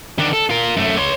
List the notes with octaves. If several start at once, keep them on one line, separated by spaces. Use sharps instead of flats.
D#3 D4
A4
F4 A#4
F#2 A3
C#5 C6